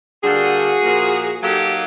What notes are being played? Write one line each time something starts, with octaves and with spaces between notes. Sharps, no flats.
D3 G3 A#3 D4 F#4 G#4
A#2 F3 A#3
F#3 A#3 D#4 G4 A4